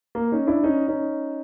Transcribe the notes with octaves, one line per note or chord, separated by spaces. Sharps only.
A#3
C#4 D#4
D4 E4
C#4 D#4
C#4 D#4